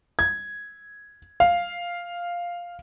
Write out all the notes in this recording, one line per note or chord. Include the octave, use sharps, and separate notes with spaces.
G#6
F5